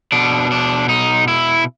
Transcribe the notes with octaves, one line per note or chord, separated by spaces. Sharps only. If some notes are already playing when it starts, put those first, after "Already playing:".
B2 D4
D4
D#4
E4